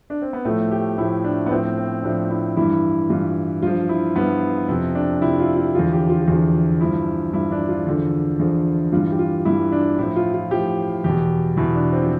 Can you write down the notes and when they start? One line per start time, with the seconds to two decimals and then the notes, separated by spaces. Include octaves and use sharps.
0.10 D4
0.22 C4
0.33 B3
0.45 A2 F3 A3
0.71 G4
0.98 A2 F3 E4
1.24 D4
1.46 B3
1.51 A2 F3 C4
1.77 C4
2.04 A2 F3 D4
2.30 E4
2.57 G2 E3 E4
3.10 G2 E3 F4
3.62 G2 F3 F4
3.89 E4
4.16 G2 F3 B3
4.68 F2 C3 F3
4.95 D4
5.21 F2 C3 F3 E4
5.39 F4
5.57 F4
5.75 E2 D3 F3 F4
5.93 G4
6.10 F4
6.21 G4
6.28 E2 D3 F3 F4
6.81 G2 F3 E4
7.33 G2 F3 E4
7.52 D4
7.69 F4
7.87 E2 D3 F3
8.39 E2 D3 F3
8.92 G2 E3 F4
9.12 G4
9.19 F4
9.45 G2 E3 E4
9.72 D4
9.98 A2 F3 E4
10.16 F4
10.34 F4
10.51 A2 F3 G4
11.04 E2 B2 G4
11.57 E2 B2 E4
11.75 D4
11.92 C4
12.03 F3